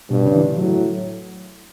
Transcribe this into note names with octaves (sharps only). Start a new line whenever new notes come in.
G2 B2
C#3
E3
D3
A2 F#3